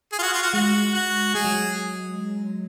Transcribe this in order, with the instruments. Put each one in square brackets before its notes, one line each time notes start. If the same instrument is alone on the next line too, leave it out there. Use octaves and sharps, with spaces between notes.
[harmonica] G#4
F4
F#4
F4
F#4
[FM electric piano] G#3 [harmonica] F#4
[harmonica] F#4
[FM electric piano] G#3 [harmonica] G#4
[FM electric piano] F#3